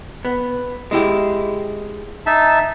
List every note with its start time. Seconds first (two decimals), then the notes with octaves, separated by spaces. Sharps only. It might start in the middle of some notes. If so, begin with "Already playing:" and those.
0.25 B3
0.91 G#3 E4 G4
2.26 D#4 E5 A5